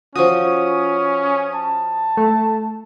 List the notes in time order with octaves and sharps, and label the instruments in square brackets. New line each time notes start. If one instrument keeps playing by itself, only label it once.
[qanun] F3 F#4 [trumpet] C#4 [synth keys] D#6
[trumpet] A5
[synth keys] A3